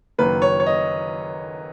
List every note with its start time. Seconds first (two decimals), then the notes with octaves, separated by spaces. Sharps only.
0.18 F#1 F#2 D#3 A#3 B4
0.42 C#5
0.60 C#5
0.66 D#5